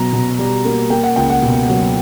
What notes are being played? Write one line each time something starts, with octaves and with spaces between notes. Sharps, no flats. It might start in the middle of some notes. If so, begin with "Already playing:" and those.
Already playing: B2 F#3 A#5
B2
G3
A#3
A#3 G5
F#5
C#2 G5
F#5
B2
F#3